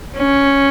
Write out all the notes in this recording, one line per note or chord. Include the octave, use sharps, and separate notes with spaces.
C#4